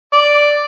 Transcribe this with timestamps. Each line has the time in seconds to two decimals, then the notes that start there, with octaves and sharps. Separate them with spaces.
0.13 D5